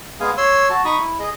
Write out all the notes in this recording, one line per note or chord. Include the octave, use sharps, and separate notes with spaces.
G#3 B3 G#4 F5 G#5
C#5 C6 E6
F#4 A5
D#4 B5 C#6 D#6
E4
G#4 D#5